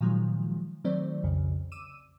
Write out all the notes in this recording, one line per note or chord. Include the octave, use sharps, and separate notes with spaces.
A#2 D#3 F3 F#3 G#3
D#3 F#3 A3 C4 C5 D5
B1 F2 C#3
D6 E6 D#7 E7